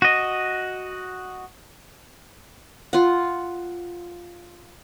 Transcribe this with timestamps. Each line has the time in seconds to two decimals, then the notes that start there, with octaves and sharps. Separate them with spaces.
0.02 F#4 D#5
2.93 F4 F#5